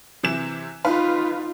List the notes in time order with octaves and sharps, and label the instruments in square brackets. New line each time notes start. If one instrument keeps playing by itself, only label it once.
[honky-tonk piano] C3 E3 E7
[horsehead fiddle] D#4 F4 [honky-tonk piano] B4 F5